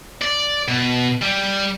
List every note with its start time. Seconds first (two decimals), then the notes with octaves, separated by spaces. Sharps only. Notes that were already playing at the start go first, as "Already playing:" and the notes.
0.22 D5
0.68 B2
1.22 G3